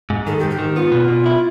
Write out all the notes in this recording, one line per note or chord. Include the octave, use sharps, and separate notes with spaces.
G#2
D#3 A4
G4
G#2
G4
D#3
B3 F4
B2
B2
E4